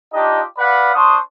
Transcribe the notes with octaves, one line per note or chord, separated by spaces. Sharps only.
D4 D#4 F4 G4 D#5
B4 D5 F5 F#5 B5
D4 C5 C6 C#6 D#6